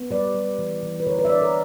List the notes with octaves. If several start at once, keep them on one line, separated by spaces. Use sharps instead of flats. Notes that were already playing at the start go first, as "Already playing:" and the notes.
Already playing: B3
G3 B4 D5
G3
E3
E3
B4
D3 A#4 C#5
B4 D5
E5
D4 B4 D5
A#4 C#5